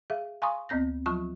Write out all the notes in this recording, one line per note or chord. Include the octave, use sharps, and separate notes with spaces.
G#4 E5 F5
F5 G#5 A#5 C6 C#6 D#6
D2 B3 C4 G6 A#6
F3 F#3 F4 A5 C#6